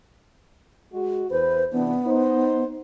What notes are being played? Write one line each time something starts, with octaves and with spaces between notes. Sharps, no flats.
G#3 F#4
E2 B4 C5
C3 E3 B3 D4
D#4 C5